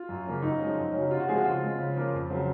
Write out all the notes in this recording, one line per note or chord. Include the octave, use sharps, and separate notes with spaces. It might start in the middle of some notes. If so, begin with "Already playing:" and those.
Already playing: F4
F#2
C#3 F3 A#3 C#4
F#2 D#4
F3 G#3 C#4
F#2
C#3 F#3 C#4
C3 F4
F#4
F3 G#3 C4 G#4
F#4
C#3 F4
G#3 C4
C#3
F3 A#3 C#4
F2
C#3 F#3 C4